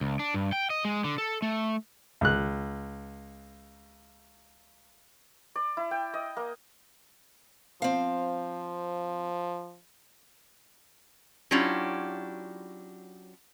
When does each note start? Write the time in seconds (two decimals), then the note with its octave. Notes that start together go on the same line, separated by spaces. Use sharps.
0.01 C#2
0.19 D4
0.34 G2
0.52 G5
0.70 D#5
0.85 G#3
1.04 D3
1.18 A4
1.42 A3
2.21 C#2 F#6
5.56 D5
5.77 E4
5.91 G5
6.14 D#5
6.37 A#3
7.82 F3 C4 F5
11.51 F#3 C#4 D4 E4 F4 G4